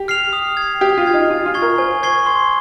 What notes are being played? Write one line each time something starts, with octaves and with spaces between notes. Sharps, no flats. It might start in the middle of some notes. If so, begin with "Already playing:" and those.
Already playing: G4
F6 C7 F7
D#6
G#6
C7
G4 D#6
F4
G#6 C7
D#4
F4 G#5
F4
C#6 G#6 C7 G7
A#4
C5 G#5
C#6 G#6 C7 G7
C6